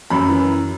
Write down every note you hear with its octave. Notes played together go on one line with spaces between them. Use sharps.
F#2 B5
E3